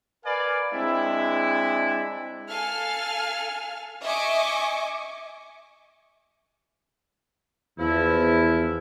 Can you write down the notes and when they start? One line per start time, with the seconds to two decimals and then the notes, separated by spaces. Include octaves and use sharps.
0.25 A#4 B4 D5 F5 G#5
0.73 G#3 C4 D4 E4
2.50 A4 F5 G#5 F6
4.03 D#5 E5 G#5 C#6 D6
7.79 E2 F3 E4